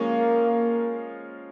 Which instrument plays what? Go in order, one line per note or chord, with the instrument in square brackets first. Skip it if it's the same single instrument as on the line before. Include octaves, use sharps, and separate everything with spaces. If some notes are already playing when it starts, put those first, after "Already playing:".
Already playing: [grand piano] F3 G#3 C#4 F4 A#4 [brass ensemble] A#3